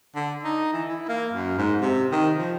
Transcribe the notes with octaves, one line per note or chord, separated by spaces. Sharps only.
D3
D#4
E3
E4
A#3
F#2
G#2
C3
D#3
F3